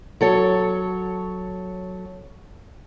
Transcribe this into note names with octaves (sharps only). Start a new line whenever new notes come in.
F#3 A4 C#5